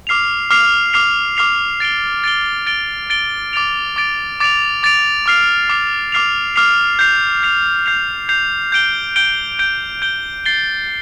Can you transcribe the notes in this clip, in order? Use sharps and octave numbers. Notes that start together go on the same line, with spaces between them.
D6 F6 C7 F7
D6 F6 C7 F7
D6 F6 C7 F7
D6 F6 C7 F7
A6 D7 G7
A6 D7 G7
A6 D7 G7
A6 D7 G7
D6 A6 D7 F7
D6 A6 D7 F7
D6 A6 D7 F7
D6 A6 D7 F7
D6 F6 C7 F7
D6 F6 C7 F7
D6 F6 C7 F7
D6 F6 C7 F7
G6 C7 F7
G6 C7 F7
G6 C7 F7
G6 C7 F7
G6 D7 G7
G6 D7 G7
G6 D7 G7
G6 D7 G7
A6 C7 G7